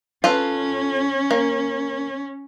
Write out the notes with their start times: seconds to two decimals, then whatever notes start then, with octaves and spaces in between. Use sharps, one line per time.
0.24 C#4 F4 A4 B4
1.31 A#3